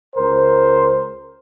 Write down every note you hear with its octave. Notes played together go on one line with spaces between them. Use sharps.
C#2 A#4 C5